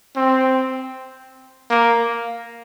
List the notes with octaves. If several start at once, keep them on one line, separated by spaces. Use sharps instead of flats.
C4
A#3